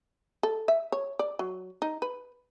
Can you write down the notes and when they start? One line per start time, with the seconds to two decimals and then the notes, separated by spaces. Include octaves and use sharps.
0.43 A4
0.68 E5
0.92 C#5
1.19 D5
1.39 F#3
1.82 D#4
2.02 B4